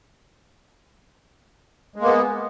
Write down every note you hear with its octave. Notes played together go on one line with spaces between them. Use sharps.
G#3 A#3 B3